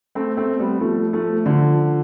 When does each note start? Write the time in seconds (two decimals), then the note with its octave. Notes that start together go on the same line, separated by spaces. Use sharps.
0.15 A3 C4
0.37 A3 C4
0.59 G3 B3
0.81 F3 A3
1.13 F3 A3
1.45 D3 F3